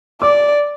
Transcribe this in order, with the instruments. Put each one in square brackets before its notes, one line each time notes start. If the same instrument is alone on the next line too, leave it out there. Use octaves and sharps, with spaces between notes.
[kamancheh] D5 [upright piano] D6